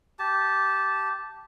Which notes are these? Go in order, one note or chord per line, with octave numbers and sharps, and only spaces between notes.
G4 A5